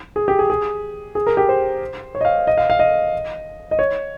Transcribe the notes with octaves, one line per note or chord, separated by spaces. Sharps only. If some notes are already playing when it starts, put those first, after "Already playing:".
G#4
G4
G#4
G#4
G#4
A#4
G4
C5
C#5
D#5
F5
D#5
F5
F5
D#5
D#5
C#5